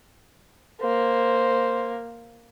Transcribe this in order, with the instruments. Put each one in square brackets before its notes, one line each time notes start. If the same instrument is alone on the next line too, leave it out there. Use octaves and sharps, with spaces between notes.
[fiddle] A#3 [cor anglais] C5